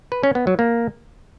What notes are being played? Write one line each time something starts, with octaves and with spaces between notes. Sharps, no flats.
B4
C#4
B3
F#3
A#3